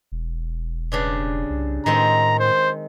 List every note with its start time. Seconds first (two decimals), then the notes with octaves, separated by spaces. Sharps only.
0.12 E1
0.92 G2 C#3 D4
1.50 C2
1.86 A2 D#3 G#3 C4 A#5
2.39 C5